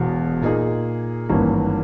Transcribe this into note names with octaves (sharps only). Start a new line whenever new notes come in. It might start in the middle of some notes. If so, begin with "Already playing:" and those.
Already playing: E1 E2 B2
A#2 A#3 D#4 G#4
G#1 G2 E3 A#3 C#4